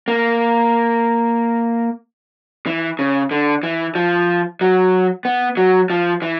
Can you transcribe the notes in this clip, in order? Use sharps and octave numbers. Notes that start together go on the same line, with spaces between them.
A#3
E3
C#3
D3
E3
F3
F#3
B3
F#3
F3
E3